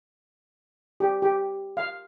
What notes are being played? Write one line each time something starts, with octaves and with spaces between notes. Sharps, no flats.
G4
G4
F5